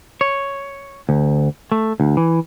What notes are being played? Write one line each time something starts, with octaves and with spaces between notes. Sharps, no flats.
C#5
D2
A3
D2
E3